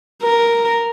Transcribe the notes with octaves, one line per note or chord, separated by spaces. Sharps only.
A#4